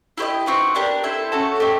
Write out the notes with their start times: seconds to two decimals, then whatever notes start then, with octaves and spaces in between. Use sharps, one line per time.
0.18 E4 G4 C5 D#5
0.46 C4 D#4 F#4 B4
0.75 B3 D4 G4 A#4
1.03 C4 E4 A4 C5
1.32 A3 C#4 F#4 A4
1.60 A3 C4 D#4 G4